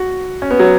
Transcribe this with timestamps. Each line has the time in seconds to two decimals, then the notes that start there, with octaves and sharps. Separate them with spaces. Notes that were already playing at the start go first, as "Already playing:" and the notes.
Already playing: F#4
0.42 C#4
0.51 B3
0.59 F#3